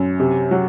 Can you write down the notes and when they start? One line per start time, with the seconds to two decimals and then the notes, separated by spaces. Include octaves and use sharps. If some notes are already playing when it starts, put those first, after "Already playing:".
Already playing: F#2
0.20 C3
0.51 F#3